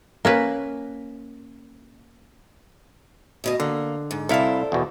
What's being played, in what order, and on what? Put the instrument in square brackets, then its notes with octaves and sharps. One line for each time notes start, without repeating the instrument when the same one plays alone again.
[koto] A#3 C#4 B4
[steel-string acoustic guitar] D2 B2 D#5
[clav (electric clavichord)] D3 [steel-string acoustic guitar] A#3
[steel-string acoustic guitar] G#2
[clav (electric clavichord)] C2 E4 F5 [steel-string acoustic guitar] A4 C5 D5
[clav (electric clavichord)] E2 B2